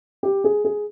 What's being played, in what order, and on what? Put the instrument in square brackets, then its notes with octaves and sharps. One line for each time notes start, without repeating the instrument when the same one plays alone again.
[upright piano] G4
G#4
G#4